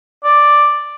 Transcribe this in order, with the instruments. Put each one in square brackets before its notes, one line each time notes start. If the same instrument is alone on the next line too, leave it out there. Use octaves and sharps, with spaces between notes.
[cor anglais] D5